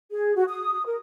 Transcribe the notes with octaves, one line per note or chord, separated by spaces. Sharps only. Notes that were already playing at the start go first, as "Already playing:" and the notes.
G#4
F#4
D#6
A#4